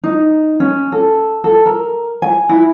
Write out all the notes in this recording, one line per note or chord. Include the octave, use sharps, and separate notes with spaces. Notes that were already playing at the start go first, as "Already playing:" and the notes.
D#4
C#4
A4
A4
A#4
G#5
E4